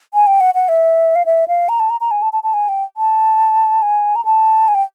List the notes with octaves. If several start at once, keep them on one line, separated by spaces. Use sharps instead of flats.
G#5
G5
F#5
F#5
E5
F5
E5
F5
A#5
A5
A#5
A#5
G#5
A5
A5
A5
G#5
G5
A5
G#5
A#5
A5
G#5
G5